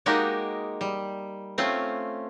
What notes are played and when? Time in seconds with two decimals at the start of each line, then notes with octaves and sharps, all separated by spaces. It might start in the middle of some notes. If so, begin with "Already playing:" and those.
0.06 G#3 A#3 D#4 F#4 G4 A#4
0.81 G3
1.58 A3 C4 C#4 F4